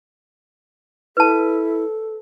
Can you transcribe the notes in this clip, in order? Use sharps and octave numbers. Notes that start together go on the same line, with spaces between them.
E4 A4 B4 A5